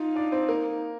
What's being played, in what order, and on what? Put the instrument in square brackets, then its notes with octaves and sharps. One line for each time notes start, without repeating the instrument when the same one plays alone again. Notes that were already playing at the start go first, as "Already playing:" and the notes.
Already playing: [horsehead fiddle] D#4 [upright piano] F4 F5
[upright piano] D4 D5
C4 C5
A#3 A#4